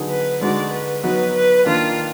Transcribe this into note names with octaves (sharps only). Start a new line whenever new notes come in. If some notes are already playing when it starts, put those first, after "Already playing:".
Already playing: D3 F#3 B3 D#4 G#4
B4
D3 G#3 D#4 F#4 D5
B4
F#3 B3 D#4 F#4 B4
B4
D#3 A#3 D4 F4